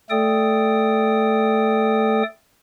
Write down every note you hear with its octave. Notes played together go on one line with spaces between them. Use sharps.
A3 A4 D5 G5 D#6